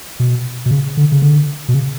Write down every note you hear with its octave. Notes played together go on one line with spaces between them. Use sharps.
B2
B2
C#3
D3
C#3
D3
B2
C#3